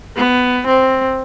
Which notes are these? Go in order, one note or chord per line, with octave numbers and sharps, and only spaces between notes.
B3
C4